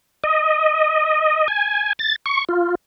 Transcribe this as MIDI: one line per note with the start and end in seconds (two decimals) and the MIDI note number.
0.24 1.48 75
1.48 1.93 80
1.99 2.16 93
2.26 2.45 85
2.49 2.75 65